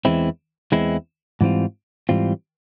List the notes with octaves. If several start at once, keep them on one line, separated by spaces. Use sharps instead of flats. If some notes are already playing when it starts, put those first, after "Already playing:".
E2 E3 G#3 C4 E4
E2 E3 G#3 C4 E4
G#2 E3 G3 C4 F4
G#2 E3 G3 C4 F4